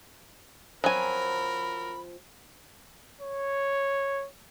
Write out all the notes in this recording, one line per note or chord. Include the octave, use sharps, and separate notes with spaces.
F3 F#3 C4 A#4 G#5 B5
C#5